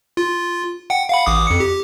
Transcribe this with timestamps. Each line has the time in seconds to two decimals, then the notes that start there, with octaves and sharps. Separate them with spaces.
0.17 F4
0.90 F#5 G5
1.09 F5 F#5 B5
1.26 A1 D6 D#6
1.47 F2 C#7
1.60 G4